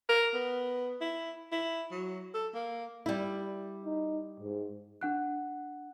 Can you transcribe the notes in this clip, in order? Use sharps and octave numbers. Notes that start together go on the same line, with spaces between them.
A#4
B3
E4
E4
F#3
A4
A#3
G3 E4
D#4
G#2
D4 F#5 F#6